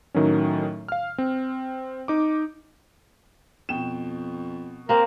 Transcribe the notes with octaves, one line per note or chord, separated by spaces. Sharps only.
A2 D#3 F#3 C#4
F5 F6
C4
D#4 D6
F2 B2 G5 E7
A#3 C4 A#4